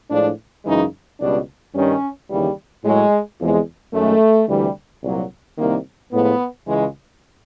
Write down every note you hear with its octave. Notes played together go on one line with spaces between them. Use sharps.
A2 F3 G#3 D4
F#2 C#3 E3 G#3 D#4
C#2 B2 G3 D4
G2 D#3 G3 C#4
D#2 C#3 E3 G3
A2 F#3 G#3
E2 C3 F3 G#3
F#2 D#3 G#3 A3
D2 C3 E3 G3
C2 A#2 F#3
C2 C3 D#3 A#3
A2 F3 G#3 B3
C#2 C#3 E3 G#3